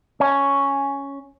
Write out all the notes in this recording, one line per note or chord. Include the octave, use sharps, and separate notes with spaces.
C#4